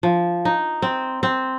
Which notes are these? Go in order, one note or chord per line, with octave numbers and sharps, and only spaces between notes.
F3
D#4
C4
C4